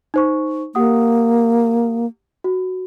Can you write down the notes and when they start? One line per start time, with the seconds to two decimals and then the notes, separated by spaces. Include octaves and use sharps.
0.14 D#4 C5 C#6
0.75 A#3 G4 F#5 D#6
2.44 F#4